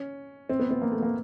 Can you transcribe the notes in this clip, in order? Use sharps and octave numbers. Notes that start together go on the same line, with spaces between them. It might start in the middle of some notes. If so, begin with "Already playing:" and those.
Already playing: C#4
C4
B3
B3
A#3
A3
A#3